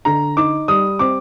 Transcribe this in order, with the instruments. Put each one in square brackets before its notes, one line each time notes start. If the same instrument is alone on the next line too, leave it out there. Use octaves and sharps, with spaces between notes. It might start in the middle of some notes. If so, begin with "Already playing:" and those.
[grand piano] D3 [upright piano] A#5
[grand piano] D#4 [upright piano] D6
[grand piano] G3 [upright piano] D#6
[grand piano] C4 [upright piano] D6